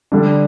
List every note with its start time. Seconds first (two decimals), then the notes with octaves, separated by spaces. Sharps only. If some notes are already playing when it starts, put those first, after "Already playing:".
0.12 D3 G3 D4